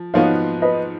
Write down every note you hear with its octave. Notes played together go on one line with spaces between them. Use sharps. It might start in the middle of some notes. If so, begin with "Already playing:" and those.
Already playing: F3
G#2 F3 B3 D#4 F#4 C#5 F5
B4 D#5